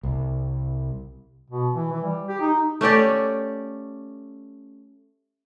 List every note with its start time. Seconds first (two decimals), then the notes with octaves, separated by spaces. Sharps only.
0.03 C2
1.50 B2
1.74 E3
1.91 E3
2.04 G3
2.29 G4
2.41 D#4
2.81 A3 C#4 G4 D5